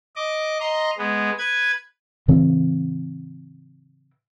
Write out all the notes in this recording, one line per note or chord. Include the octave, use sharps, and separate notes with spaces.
D#5 D6
D#5 A#5 C6
G#3 B3
B4 G#6
A2 C#3 E3 C4